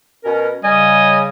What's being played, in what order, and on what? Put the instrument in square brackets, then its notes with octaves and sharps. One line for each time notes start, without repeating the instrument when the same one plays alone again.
[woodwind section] B2 C#4 A#4
[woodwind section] C#3 G3 [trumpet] D#5 [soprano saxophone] G#5